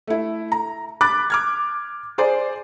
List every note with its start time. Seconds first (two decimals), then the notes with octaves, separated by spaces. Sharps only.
0.07 A3 E4
0.52 A#5
1.01 B5 D6 F#6 A6
1.30 D6 F6 G#6
2.18 G#4 C5 D5